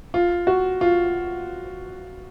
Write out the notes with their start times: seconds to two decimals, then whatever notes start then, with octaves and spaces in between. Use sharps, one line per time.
0.14 F4
0.47 F#4
0.81 F4